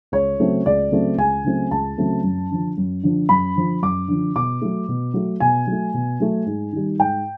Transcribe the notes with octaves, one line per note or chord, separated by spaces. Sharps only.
C#2 C#5
C#3 F#3 A3 C4
C#2 D5
C#3 F#3 A3 C4
C#2 G#5
C#3 F#3 A3 C4
C#2 A5
C#3 F#3 A3 C4
F#2
D3 F3
F#2
D3 F3
F#2 B5
D3 F3
F#2 D6
D3 F3
B2 D6
F#3 A3
B2
F#3 A3
B2 G#5
F#3 A3
B2
F#3 A3
G#2
D#3 G3
G#2 G5